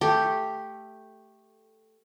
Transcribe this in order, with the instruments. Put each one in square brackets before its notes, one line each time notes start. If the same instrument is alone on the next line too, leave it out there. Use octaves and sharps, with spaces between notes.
[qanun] A3 G4